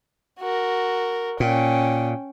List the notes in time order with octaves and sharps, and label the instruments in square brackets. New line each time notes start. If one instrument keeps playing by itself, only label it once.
[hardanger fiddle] F#4 A#4
[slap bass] A#2 [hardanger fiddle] C#4 G5